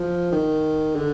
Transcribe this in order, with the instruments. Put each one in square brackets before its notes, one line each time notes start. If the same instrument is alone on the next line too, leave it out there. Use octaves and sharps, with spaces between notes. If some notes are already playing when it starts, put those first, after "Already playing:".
Already playing: [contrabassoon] F3
D#3
D3